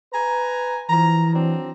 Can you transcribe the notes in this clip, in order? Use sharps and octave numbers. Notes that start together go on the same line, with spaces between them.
B4 G#5 A#5
E3 F3 A#5
F#3 C4 D4